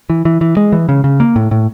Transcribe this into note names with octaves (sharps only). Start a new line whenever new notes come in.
E3
E3
E3
G#3
E3
C#3
C#3
A#3
A2
A2